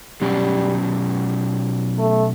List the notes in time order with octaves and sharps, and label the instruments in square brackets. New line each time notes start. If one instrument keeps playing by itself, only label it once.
[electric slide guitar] B2 F#3 C#4 G4 [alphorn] G3
[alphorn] A3